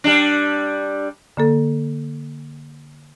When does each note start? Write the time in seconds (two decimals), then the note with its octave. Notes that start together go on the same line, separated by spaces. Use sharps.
0.04 G3 D4
1.37 D3 A#3 A4